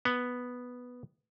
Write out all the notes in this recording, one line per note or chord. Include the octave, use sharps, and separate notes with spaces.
B3